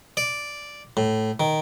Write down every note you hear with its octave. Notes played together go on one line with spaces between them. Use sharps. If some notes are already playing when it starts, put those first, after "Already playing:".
D5
A2
D#3